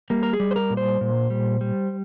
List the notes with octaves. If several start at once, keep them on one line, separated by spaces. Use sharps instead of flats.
G3 A#3
A#4
G#4
G3
C5
A#4
A#2
C5
A#2
G3
G3